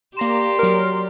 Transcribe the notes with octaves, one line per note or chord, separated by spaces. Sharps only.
A#3 G4 D5 A#5 C6 E7
F#3 A#4